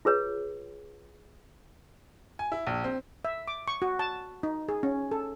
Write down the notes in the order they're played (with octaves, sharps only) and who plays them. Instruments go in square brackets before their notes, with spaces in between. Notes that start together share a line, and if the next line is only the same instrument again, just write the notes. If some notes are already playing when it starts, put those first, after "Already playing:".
[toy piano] F4 G#4 B4 C#5
[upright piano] G#5
E4
A#1
C4
[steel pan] E5
D6
C#6
F#4
A5
D#4
G#4
C#4
A4